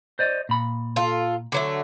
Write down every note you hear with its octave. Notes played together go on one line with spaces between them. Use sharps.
C5 D5 D#5
A#2 B5
F4 A4
D3 F#3 A3